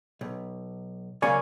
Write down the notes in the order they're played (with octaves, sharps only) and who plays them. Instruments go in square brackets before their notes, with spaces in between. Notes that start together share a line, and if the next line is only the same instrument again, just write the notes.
[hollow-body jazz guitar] B1
[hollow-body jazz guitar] C#3 F#3 A#3 [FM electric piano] D5 G#5 C#6